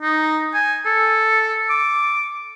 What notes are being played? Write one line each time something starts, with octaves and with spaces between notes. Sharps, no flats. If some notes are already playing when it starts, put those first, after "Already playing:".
D#4
G#5
A4
D6